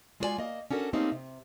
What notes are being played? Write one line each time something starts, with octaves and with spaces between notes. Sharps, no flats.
G#3 F4 F#4 A4 D5 G#5
A#3 D#5
C#4 D4 F#4 A4 A#4
A3 A#3 C4 C#4 D#4 G4
C3